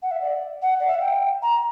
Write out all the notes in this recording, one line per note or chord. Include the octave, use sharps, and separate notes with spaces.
F#5
E5
D5
F#5
D5
E5
F#5
G5
A#5